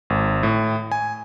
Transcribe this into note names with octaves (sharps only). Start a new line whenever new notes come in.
G#1
A2
G#5